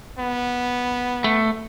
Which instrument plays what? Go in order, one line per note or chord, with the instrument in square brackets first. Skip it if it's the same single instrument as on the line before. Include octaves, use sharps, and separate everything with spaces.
[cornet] B3
[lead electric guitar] A3